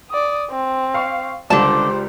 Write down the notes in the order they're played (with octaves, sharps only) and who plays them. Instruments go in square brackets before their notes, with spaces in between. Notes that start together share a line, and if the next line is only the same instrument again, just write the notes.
[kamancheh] D5 D#6
C4
[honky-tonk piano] F5 C#6
[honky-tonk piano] C#2 G3 G4 [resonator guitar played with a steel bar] D3 A5 [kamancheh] C5 D5